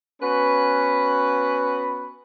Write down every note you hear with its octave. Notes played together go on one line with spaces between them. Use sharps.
B3 C#4 F#4 B4